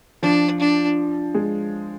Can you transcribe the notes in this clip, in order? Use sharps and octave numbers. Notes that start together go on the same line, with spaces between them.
F3 D4
D4
G#3